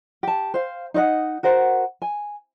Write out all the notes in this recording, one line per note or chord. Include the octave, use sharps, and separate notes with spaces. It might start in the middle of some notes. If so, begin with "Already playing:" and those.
G4 A5
C5 F5
D#4 C#5 D#5 F#5
F#4 A#4 C5 F#5
G#5